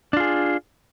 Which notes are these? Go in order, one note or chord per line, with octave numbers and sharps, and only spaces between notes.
D4 F4 G#4